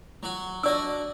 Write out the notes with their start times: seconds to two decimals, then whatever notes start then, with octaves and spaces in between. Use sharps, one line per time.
0.23 F#3 F#4
0.63 D4 F#4 D5 D#5 E6